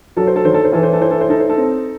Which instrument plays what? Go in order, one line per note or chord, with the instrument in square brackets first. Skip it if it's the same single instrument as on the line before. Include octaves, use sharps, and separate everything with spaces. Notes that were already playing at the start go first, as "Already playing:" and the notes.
[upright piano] F#3 A4
C5
A4
D#3 C5
A4
C5
E3 A4
C5
A4
E4 C5
A4
C5
D#4 A4
C5
A4
C4